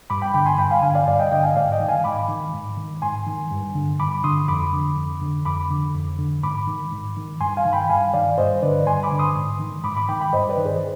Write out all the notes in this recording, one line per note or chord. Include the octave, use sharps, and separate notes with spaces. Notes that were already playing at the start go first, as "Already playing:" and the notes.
G2 B5 D6
G5 B5
D3 G5 B5
G#5 C6
G2 G5 B5
F5 G#5
D3 F5 G#5
D5 F5
G2 D5 F5
D#5 G5
D3 D#5 G5
F5 G#5
G#2 D5 F5
D#5 G5
D#3
F5 G#5
G#2 B5 D6
D#3
G#2
D#3
G#2 G#5 C6
D#3
G2
D3
G2 B5 D6
D3 C6 D#6
F2 B5 D6
D3
F2
D3
F2 B5 D6
D3
F2
D3
G#2 B5 D6
D#3
G#2
D#3
G2 G#5 C6
F5 G#5
D#3
G5 B5
G2 F5 G#5
D#3 D5 F5
G2 C5 D#5
D3 B4 D5
G2 G#5 C6
B5 D6
D3
C6 D#6
G#2
D#3
G#2 B5 D6
B5 D6
D#3 G5 B5
G5 B5
G2 C5 D#5
B4 D5
D#3
G#4 C5